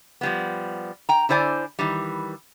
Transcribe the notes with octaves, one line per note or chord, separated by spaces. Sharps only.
F3 G3 B3
G5 A#5
D3 E4 C5 D5 G#5
D#3 E3 G3